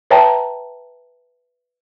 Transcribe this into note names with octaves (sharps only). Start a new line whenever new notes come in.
B4 C#5 E5 G5 A5 A#5